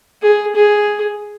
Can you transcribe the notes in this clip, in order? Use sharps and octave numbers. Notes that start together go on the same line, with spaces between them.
G#4
G#4